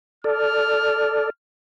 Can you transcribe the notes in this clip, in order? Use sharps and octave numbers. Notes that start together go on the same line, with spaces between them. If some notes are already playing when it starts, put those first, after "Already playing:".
A4 D5 F6